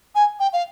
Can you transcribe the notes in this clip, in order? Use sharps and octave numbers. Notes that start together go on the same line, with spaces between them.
G#5
G5
F5